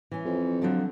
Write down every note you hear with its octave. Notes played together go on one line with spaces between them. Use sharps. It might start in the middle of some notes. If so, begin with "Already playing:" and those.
E3 C#4
F2
D3 F3 F#3